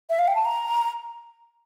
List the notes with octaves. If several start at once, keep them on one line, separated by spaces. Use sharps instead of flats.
E5
F5
G5
A5
A#5